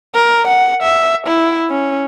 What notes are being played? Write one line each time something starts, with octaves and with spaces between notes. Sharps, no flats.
A#4
F#5
E5
E4
C#4